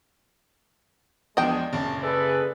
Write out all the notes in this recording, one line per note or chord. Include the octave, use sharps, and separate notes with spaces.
E2 F3 G#3 D4 D#5 G5
F#1 C#3 C#4 D5 A5
G#4 A4 B4 D5 E5